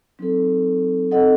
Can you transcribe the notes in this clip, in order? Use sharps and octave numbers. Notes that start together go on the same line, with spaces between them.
F#3 C4 D#4 A4
C4 D#4 A4 D#5 F#5